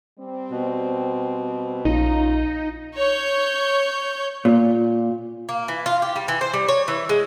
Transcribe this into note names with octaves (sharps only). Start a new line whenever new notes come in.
G3 C4
B2
A#1 A3 C#4 D#4 F4
C#5 G6
A#2
A#3
E3
F4
G4
G3
E3
C5
G3
C#5
E3
G#3